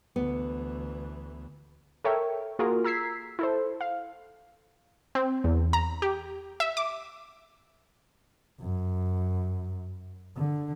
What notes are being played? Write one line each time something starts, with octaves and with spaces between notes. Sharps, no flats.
D2 E3 B3
A4 A#4 C#5 E5 G5
A#3 F4 F#4 G#4 A#4
A#5 E6 G#6 B6 C7
E4 A4 C5
F5
C4
E2
A#5
G4
E5
D6
F#2
D3